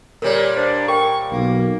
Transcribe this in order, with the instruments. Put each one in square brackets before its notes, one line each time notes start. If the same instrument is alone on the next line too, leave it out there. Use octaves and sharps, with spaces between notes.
[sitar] A#2 G3 [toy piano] A#4 C#5 D5
[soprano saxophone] D4 [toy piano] C5
[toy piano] A#4 G5 [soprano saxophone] C#6
[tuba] B1 [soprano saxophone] A#3